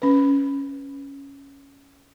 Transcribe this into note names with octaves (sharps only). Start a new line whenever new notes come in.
C#4 B4